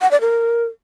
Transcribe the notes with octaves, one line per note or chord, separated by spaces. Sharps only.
F#5
D5
A#4